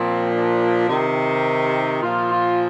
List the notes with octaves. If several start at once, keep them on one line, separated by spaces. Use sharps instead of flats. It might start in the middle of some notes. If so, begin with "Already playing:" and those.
Already playing: A#2 F3 C4
D4
C3 D#3 D#4
A#2 F3 F4
F4